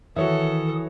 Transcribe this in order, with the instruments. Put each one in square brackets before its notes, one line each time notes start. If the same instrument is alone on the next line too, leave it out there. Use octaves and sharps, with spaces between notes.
[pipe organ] D#3 D#6 [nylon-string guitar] E3 [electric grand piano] F#4 C#5 E5 [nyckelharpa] A4